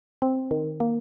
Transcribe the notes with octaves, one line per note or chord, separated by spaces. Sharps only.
C4
D#3
A#3